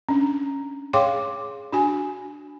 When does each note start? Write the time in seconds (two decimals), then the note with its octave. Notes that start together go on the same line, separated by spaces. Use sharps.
0.09 C#4 D4
0.93 G#4 C#5 F5 G5 C6 D6
1.72 D4 F#4 G#5